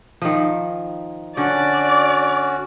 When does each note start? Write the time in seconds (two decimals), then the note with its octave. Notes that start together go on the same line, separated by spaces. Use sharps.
0.22 D#3 F3
1.37 D3 C#4 F#4 D5